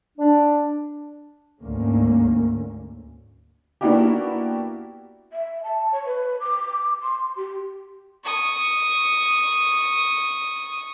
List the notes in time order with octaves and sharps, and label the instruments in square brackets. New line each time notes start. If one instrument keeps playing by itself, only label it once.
[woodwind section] D4
[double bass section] D2 G#2 D3 A3 A#3 C#4
[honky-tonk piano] A#3 B3 D4 E4 F#4 G4
[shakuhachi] E5
A5
C#5
B4
D6
C6
G4
[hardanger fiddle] C#6 D#6